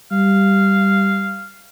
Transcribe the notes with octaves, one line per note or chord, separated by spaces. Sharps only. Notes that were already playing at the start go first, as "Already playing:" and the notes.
G3 F5